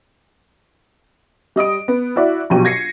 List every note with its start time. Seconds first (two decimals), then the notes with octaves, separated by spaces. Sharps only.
1.56 G3 D#5 D#6 D7
1.88 B3
2.16 E4 F#4 D5 E5
2.50 A#1 B2 F#3 G4 D#7
2.65 G#6 A#6 C7 C#7